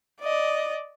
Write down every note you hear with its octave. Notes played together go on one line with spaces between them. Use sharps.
D5 D#5